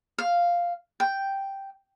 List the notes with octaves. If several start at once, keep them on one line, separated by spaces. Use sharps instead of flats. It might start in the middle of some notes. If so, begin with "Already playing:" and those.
F5
G5